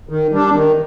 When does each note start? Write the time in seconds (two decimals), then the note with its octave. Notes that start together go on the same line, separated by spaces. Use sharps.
0.09 D#3
0.32 G3 D4
0.54 D#3